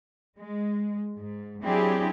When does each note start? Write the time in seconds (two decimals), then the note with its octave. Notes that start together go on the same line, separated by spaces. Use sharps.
0.39 G#3
1.18 G#2
1.63 F#3 C4 D4 E4 G4 G#4